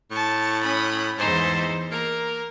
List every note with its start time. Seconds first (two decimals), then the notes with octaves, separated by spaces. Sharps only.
0.11 A2 A5 C#6
0.63 C#4 B5 D#6
1.18 E2 G#2 D#4 C5
1.91 A#3 A#4